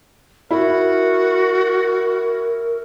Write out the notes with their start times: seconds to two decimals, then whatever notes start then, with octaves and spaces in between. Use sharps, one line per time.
0.51 E4 F#4 A#4